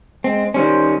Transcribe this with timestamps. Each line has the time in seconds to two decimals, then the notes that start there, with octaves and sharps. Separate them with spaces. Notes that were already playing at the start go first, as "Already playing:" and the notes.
0.24 G#3 C4
0.54 D#3 G3 C#4 C5